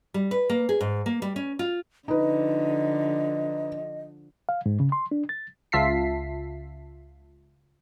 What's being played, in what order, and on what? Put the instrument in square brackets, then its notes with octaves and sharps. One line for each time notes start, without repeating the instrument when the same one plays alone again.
[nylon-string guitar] G3
B4
A#3
G#4
G#2
A#3
G3
C#4
F4
[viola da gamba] D3 F3 [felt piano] D#4 B4 [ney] D#5
[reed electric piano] F5
G#2
C#3
C6
D4
A6
[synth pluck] C#2 F4 E5 A5 B6 C7